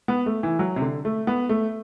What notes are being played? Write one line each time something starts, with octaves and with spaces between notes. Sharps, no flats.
B3
A3
E3
F#3
C3
D3
A3
B3
A3